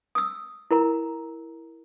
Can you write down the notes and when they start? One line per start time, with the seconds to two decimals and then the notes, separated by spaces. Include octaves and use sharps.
0.15 D#6 E6
0.71 E4 A#4 A#5